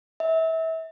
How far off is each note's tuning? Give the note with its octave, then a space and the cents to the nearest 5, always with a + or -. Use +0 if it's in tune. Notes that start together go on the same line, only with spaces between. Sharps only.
E5 -30